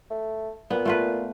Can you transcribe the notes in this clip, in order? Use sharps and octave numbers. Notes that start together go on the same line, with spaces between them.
A3
A#2 B3
A3 F4 B4